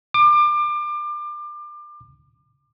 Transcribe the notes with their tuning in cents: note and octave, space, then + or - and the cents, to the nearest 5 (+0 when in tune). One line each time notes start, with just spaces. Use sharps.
D6 +30